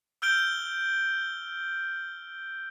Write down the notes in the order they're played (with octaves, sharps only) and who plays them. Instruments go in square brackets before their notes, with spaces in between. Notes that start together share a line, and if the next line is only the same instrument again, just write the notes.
[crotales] E6 F6 G6 D7 G7